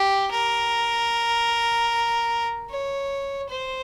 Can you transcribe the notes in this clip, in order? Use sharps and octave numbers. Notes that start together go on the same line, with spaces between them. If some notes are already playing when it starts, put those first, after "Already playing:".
Already playing: G4
A#4
C#5
C5